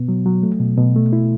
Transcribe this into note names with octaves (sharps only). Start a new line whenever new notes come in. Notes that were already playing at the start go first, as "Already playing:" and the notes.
Already playing: B2 B3
F#3
F#3
A3
B2
B2
A3
E4